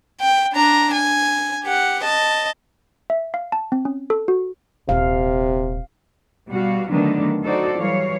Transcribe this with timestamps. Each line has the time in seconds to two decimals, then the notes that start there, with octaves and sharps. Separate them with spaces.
0.21 G5
0.53 D4 A#5
0.94 G#5
1.64 G4 F#5
2.04 D#5 A5
3.10 E5
3.34 F5
3.52 A5
3.72 C4
3.85 C#4
4.10 A4
4.28 F#4
4.89 D#1 C3 F5
6.49 B2 G3 F#4 F5
6.89 D3 D#3 F#3 A3 B3 D4
7.44 D#4 F#4 A4 C5 D5
7.79 E3 F#3 G3 C#5 F5